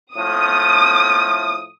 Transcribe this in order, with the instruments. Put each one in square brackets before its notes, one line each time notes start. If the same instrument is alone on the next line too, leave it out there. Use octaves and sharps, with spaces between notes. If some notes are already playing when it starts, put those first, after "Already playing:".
[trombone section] A2 F3 A3 [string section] D#6